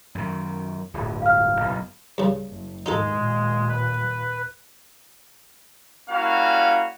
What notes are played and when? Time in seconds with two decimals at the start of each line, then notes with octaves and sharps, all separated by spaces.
0.15 F#2 D#3
0.94 D1 G1 D3
1.22 F5 F6
1.60 F#1 B1
2.18 G2 C#3
2.49 F#1
2.86 D#2 G#2 G#3 D#4 F4 A4
3.16 D#2 A#2
3.69 B4
6.10 G3 A#3 C#4 E4 F#4 F5